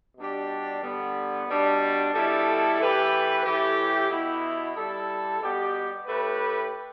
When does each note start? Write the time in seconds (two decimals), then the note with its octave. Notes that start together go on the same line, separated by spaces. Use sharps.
0.17 B2 G3 D4 G4
0.82 D3 G3 B3
1.48 B2 G3 D4
2.13 B2 G3 E4 A4
2.79 E3 A3 G4 B4
3.45 A2 E3 A3 E4 G4
4.10 B2 B3 E4
4.76 G3 E4 A4
5.41 B2 G3 B3 G4
6.06 A2 A3 G4 B4